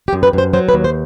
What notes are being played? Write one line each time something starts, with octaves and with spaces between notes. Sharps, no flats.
G4
F#2
B4
F#2 C5
F#3 C5
B4
D#2
C5